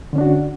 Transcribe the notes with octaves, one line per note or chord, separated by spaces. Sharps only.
D3 C#4 D4 F#4